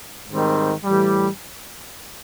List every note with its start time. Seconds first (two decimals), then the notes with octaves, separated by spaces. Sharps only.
0.29 G#2 D#3 G3 C4
0.84 A2 E3 G3